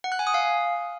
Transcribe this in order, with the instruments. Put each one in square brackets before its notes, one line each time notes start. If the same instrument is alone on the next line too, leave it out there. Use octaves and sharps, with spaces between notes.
[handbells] F#5
F#6
G#5
D#6
F5